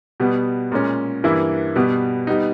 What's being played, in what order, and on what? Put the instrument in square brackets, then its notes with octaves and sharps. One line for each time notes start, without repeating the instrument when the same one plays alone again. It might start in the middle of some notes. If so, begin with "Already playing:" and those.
[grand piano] B2 G3 B3
A#2 G#3 C#4
G2 E3 A#3 E4
B2 G3 B3
G3 B3 D#4